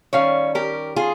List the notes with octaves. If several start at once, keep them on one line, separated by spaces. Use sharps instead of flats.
D#3 G3 C#4 C#5 F5
G4 A#4
F4 G#4